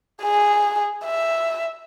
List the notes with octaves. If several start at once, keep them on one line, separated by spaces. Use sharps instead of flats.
G#4
E5